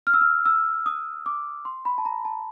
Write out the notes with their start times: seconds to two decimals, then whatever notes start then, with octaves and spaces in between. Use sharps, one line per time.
0.07 F6
0.14 E6
0.21 F6
0.46 E6
0.86 D#6
1.26 D6
1.65 C6
1.85 B5
1.98 A5
2.05 A#5
2.25 A5